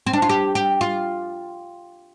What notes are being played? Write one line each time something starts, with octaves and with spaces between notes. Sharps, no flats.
C4
D4
F4
G4
G4
F4